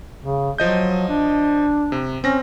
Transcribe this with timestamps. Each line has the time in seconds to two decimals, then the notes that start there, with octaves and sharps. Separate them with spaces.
0.22 C#3
0.58 F3 F#3 D#5 G6
1.09 D4
1.92 C3
2.24 C4 C#4 A#6